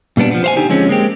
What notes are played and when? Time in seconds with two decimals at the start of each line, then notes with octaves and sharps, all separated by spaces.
0.17 A#2 G3 B3 D4
0.31 F3 B3
0.44 C5 F5 G#5
0.56 D3 D#4 G4 G#5
0.69 D3 F3 G#3 C4 C#4
0.89 G#3 A#3 C4 G4